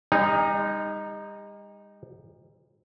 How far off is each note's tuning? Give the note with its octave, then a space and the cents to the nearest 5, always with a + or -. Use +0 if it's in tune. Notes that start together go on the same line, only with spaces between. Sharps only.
G3 +45 D#4 +0